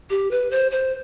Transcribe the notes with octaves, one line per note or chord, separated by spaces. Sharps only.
G4
B4
C5
C5